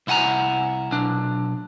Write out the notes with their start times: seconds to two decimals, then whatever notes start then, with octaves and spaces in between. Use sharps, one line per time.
0.07 C2 E4 F#5 G#5 A#5
0.91 B1 D4